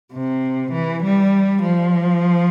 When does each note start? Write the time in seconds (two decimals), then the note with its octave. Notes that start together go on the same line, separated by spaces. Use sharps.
0.13 C3
0.72 E3
1.02 G3
1.62 F3